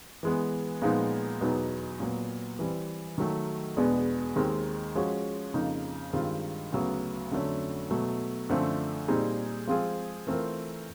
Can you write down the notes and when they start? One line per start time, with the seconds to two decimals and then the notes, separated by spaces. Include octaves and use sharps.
0.23 E3 G#3 B3
0.82 A#2 F3 G#3 B3 D#4
1.41 E2 B2 F#3 B3 D#4
2.00 A#2 F#3 B3
2.59 E3 G3 C4
3.18 D#3 F#3 A3
3.77 E2 B2 G#3 B3 D4
4.36 D#2 D#3 G#3 C4
4.95 F3 G#3 C#4 F#4
5.54 F2 C#3 F3 A#3 D#4
6.13 G2 D#3 G#3 C4 F4
6.72 D2 C#3 F#3 B3
7.31 F2 D3 F#3 A3 C#4
7.90 B2 F#3 A3
8.49 F#2 D3 F3 A3 C4
9.08 A#2 G3 C4 D#4 G#4
9.67 F3 G#3 C4 F4 G#4
10.27 E3 A3 C4 F4 A#4